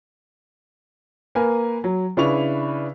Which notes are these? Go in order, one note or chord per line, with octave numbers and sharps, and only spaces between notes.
A#3 A#4 B4 G#5
F#3
C#3 D4 E4 B4 C#6 F7